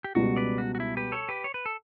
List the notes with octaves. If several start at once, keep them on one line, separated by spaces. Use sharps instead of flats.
G4
C#2 B2 G3 F#4
B4 D5
F#4
F#4
E4
G4 B4
A4 C#5
G4 B4
C#5
B4
A4